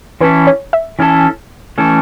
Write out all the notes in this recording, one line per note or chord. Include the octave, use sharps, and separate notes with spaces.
E3 C#4 E4 A4 B4
C#5
E5
E3 C#4 E4 A4
E3 A3 C#4 A4